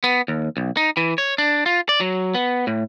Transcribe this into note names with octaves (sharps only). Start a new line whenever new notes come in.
B3
D#2
B1
D#4
E3
C#5
D4
F4
D5
F#3
B3
A2